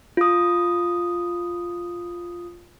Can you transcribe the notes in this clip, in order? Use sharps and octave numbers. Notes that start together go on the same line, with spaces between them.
F4 D#6